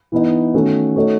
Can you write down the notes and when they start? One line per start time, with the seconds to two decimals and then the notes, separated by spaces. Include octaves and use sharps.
0.12 E3 B3 D#4
0.54 D#3 A3 C#4 F#4 A4
0.96 A3 D#4 F#4 A4 C#5